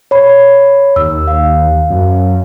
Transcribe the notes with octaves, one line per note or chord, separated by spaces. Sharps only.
C#5 B5
D#2 E6
F5
F#2